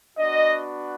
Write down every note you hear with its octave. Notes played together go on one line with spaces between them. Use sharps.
B3 D4 F#4 D#5